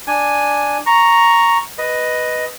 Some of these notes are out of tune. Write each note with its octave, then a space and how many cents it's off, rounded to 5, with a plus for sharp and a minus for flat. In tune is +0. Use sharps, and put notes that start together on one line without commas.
D4 +0 G#5 +0
A#5 +0 C#6 +0
B4 +0 D#5 +0